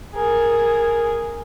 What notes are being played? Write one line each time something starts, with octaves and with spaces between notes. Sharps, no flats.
G#4 A#4